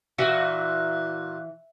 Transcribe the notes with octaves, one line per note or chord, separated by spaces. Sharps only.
A#2 E3 F#4